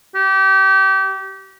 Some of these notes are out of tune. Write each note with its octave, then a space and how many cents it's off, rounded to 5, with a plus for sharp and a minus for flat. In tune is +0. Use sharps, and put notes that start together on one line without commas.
G4 -30